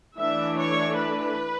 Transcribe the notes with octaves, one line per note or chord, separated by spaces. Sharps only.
E3 A3 D4 E5
C#5
B4